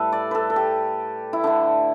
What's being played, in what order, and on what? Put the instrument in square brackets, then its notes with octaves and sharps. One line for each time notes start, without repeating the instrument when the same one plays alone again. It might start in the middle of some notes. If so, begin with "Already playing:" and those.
Already playing: [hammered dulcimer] A2 G3 A4 B4
D5
A4 B4
A4
G4
E4
D3 A3 D4